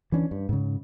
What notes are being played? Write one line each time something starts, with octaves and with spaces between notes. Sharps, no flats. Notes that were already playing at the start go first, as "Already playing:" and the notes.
E3 C#4 D4
G2
G#2 C#3